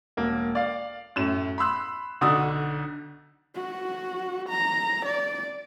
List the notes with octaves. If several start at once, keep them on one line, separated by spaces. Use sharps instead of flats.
E1 A#3
D5 F5
F#2 A2 E7
B5 C6 E6 F#6
B1 D3 F#4 D5 D#6 E6
F#4
A#5
D5